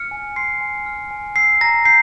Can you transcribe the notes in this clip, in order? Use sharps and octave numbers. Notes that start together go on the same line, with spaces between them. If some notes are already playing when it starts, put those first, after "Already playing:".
Already playing: F6 C#7
G#5
C6 C7
G#5
F6
G#5
E6 C7
A#5 A#6
G6 C7